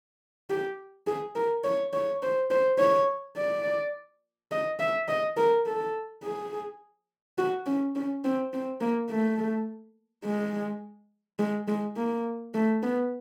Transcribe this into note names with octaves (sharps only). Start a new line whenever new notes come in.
G4
G#4
A#4
C#5
C#5
C5
C5
C#5
D5
D#5
E5
D#5
A#4
A4
G#4
F#4
C#4
C#4
C4
C4
A#3
A3
G#3
G#3
G#3
A#3
A3
B3